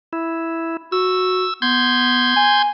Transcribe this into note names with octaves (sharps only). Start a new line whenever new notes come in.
E4
F#4 E6
B3 C6 G6 G#6
G#5